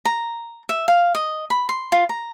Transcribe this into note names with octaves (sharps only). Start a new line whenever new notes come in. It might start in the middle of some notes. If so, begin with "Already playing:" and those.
A#5
E5
F5
D#5
B5
C6
F4
A#5